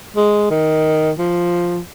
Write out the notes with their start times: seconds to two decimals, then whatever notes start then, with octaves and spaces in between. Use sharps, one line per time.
0.16 G#3
0.50 D#3
1.18 F3